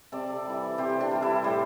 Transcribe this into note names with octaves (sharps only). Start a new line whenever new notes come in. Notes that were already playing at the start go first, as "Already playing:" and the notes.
C3 A4 D5
E3 G3
C3 G4 C5
D4 G4
E3 G3
E4 A4
A2 G4 C5